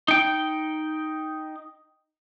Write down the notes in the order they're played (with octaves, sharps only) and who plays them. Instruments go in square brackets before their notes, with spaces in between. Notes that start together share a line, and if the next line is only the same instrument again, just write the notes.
[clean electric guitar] D#4 G5